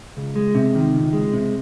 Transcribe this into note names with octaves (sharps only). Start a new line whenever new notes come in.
C#2
G#3
C3
D#3
C#2
G#3
C3